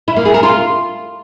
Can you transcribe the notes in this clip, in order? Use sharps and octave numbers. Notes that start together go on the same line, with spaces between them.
E4
A#3
G#4
A#4
F4